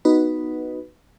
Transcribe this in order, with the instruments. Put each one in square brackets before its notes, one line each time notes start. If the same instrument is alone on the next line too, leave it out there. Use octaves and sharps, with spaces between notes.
[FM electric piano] B3 D#4 F#4 B4